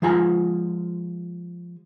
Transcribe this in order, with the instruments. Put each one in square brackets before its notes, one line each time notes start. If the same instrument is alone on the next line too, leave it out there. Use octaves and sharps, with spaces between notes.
[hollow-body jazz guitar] F3 G#3 F4 G#5 A#5